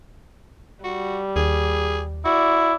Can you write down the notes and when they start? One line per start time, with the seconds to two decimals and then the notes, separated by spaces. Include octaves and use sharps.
0.84 G3 F#4
1.36 D#2 G#4
2.25 E4 F#4 D5